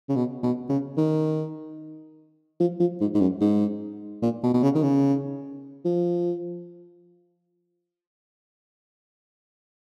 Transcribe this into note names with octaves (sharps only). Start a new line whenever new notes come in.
C#3
B2
B2
C#3
D#3
F3
F3
G#2
G#2
F#2
G#2
A#2
B2
B2
C#3
D#3
C#3
F3